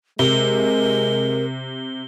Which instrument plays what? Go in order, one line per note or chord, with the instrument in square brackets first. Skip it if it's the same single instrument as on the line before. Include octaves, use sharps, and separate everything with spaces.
[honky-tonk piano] C3 [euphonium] G#3 [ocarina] A#4 [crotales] G7